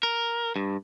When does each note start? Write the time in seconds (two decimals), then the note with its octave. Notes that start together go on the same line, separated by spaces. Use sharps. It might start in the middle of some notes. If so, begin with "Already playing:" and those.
0.03 A#4
0.56 G2